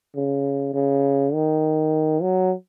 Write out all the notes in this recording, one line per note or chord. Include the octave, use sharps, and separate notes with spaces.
C#3
C#3
D#3
F#3